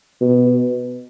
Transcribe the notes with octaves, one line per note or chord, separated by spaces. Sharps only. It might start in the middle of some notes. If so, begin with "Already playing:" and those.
B2